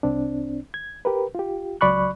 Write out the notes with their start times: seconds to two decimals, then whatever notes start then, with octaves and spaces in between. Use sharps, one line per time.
0.03 C2 C4 D4
0.74 G#6
1.05 G4 A#4 B4
1.35 F4 G4
1.81 C#2 F#3 D5 B5 C#6 F#6